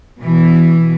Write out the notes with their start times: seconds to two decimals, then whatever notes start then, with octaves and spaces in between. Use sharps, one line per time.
0.19 B2 E3